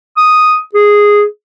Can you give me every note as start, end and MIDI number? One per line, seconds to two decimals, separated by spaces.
0.17 0.59 87
0.75 1.23 68